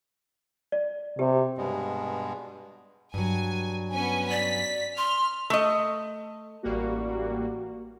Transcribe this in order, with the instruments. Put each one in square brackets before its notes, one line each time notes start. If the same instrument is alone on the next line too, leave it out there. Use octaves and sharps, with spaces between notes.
[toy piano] D5
[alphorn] C3 [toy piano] G4
[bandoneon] G2 B2 G#3
[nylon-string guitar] G2 F#3 [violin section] G#5
[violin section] B3 C#4 G#5
[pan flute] D5 [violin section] B6
[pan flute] C6 [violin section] F6
[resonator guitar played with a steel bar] A3 D#5
[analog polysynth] A1 G3 A#3 F#4